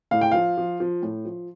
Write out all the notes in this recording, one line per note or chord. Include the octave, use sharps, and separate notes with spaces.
A2 F5
G5
F3 F5
F3
F3
A2
F3